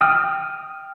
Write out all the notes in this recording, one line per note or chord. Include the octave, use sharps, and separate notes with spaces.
G5 D#6 F6